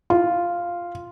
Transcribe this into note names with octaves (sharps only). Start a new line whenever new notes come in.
F4